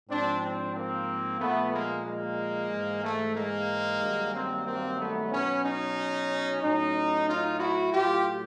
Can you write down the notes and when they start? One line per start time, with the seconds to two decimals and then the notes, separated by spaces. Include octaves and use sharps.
0.09 G#2 F3 C4 D4
0.41 C4 D4
0.74 A#3 C4
1.40 A#2 F3 A3 B3
1.72 G#3 A#3
2.05 G#3 A#3
2.70 G#2 E3
3.03 A3
3.35 G#3 A#3
4.01 G2 D#3 F#3
4.33 A#3 C4
4.66 A#3 C4
4.99 A3 B3
5.31 B2 F#3 B3 C#4
5.64 C#4 D#4
6.62 A2 F#3 C#4 D#4
7.27 D#4 F4
7.59 E4 F#4
7.92 A2 F#3 F4 G4